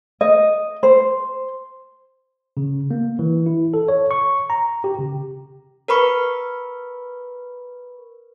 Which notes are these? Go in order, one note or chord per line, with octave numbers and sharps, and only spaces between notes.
D#5
C5
C#3
A#3
E3
E4
A4
C#5
C#6
A#5
G4
C#3
A#4 B4 B5 C#6